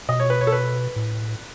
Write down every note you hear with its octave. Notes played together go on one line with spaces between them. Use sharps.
B2 D#5
C#5
B4
C#5
A4
B4
A2